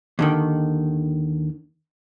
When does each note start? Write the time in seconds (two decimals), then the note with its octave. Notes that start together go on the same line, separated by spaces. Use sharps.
0.19 D#2 D3 D#3